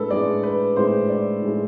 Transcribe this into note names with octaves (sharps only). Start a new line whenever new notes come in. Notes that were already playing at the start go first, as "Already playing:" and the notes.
Already playing: A2 G#3 D4 A4 B4
A2 G#3 D4 D5
B4
A2 G#3 D4 C5
D5
A2 G#3 D4